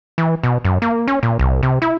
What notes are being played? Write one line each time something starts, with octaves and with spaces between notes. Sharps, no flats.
E3
B2
F#2
A#3
C#4
A#2
C2
C3
E4